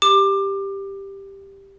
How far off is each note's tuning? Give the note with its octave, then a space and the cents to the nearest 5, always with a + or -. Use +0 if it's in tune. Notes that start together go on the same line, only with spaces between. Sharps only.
G4 +0 D6 +20